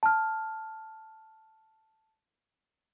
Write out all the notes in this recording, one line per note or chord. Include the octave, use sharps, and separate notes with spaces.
A5 F6